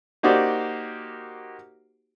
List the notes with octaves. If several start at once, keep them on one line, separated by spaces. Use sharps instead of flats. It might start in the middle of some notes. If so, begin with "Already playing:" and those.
A#3 D#4 F#4 G4 C5 D5